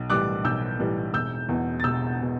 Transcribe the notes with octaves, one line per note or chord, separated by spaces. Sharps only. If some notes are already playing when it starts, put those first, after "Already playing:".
Already playing: B1
A2 E3 G3 D6 F#6
B1 E6 G6
A2 E3 G3
E1 E6 G6
E2 B2
A6
E1 E6 G6
B2